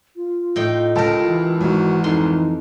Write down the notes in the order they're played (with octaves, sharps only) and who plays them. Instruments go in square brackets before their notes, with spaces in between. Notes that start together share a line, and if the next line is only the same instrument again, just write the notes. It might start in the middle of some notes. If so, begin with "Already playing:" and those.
[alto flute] F4
[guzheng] A2 D#4 G5
[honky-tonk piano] C#2 A4 A5 [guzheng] G4 A#4
[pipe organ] E3
[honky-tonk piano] G#1 G#2 [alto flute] F#4
[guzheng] F2 C6 [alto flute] D#4